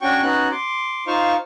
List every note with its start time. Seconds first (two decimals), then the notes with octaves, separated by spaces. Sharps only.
0.01 C#4 D4 F#4 G5 C#6
0.22 B3 C#4 D#4 F#4 F#6
0.51 C6 D6
1.07 D#4 F4 C5 F5 C#6